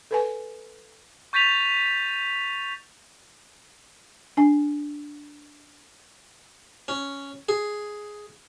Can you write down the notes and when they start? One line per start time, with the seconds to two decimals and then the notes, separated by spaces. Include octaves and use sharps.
0.11 A4 B4 G#5
1.33 C#6 G6 A6 B6 D#7 F7
4.37 D4 G#5
6.88 C#4
7.49 G#4